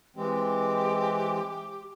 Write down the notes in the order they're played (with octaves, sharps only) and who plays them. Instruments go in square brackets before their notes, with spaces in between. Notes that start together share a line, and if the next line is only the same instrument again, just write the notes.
[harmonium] E3 G#3 C4 [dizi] G4